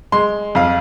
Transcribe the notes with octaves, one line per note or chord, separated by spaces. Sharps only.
G#3 C6
F2 F5